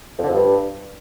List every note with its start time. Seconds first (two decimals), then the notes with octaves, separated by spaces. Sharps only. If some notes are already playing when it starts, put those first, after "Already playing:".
0.18 F2
0.23 D3
0.29 F2
0.34 G2